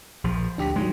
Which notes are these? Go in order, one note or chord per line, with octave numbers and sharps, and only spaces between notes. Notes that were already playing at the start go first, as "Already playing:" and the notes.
A#1 F3
D2 D4 G4 B6
G#2 D#3 F#3 G#3